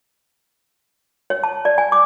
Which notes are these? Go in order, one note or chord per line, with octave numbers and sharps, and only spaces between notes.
C#5
A5
D5
G#5
D6